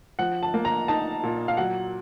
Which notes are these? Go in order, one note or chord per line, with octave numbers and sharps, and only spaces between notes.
F3 F#5
A5
A#3
A#5
D#4 A5
A#2
F5
F#3 F#5